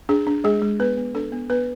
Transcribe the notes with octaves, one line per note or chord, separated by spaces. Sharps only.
D4 G#4
D4
G#3 G#4
G#3
B3 B4
B3
D4 A4
B3
B3 B4